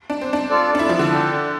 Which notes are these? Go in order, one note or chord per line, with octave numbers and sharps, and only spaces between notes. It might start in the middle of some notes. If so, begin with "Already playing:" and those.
D4
C4
D4
F4 A4 D5
D4
E4
F3
D3
D4 A4 D5 G5